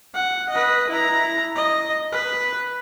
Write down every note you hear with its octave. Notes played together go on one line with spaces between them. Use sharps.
F#5
B4 D#5
E4 A#5
D#5
B4